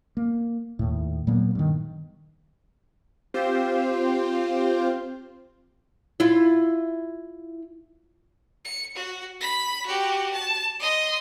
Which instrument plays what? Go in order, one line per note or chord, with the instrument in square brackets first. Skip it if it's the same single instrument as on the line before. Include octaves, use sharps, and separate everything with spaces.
[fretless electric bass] A#3
D#2 A2
A#2 F#3 A#3 B3
G2 D#3
[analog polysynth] C4 F4 G4 C5
[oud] E4 F4
[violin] C#7
F#4
B5 B6
F#4 G4
A5
D#5 C6